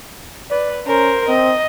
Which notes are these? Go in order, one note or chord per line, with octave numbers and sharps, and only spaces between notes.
B4 D5
C#4 A#4 C5
C4 D#5